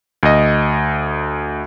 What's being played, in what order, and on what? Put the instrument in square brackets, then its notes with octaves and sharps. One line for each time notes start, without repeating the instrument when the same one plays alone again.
[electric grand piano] D2 D#5